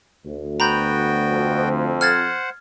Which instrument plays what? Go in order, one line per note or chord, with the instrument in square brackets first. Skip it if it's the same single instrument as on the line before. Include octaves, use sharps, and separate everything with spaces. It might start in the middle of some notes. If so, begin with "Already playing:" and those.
[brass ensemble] D2
[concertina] B3 F#4 G5 [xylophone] A#5 B5 G6
[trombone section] F2
[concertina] C5 F#5 [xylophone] F6 G#6 A6